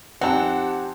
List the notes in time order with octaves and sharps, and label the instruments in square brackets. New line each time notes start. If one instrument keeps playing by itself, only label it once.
[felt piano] F2 D#4 G#5 [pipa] C4 [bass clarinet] G4 [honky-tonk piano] F#5 A5